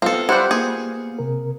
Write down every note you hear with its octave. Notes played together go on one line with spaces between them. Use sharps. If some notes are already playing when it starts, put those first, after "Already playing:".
B3 C4 F4 A4 F5
G3 E4 G4 C5 F#5
A#3 G#4
C3 A#4